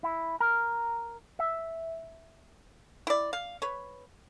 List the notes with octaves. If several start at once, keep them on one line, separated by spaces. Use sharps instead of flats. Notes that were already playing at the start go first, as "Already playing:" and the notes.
E4
A#4
E5
E4 D5
F5
B4 C#5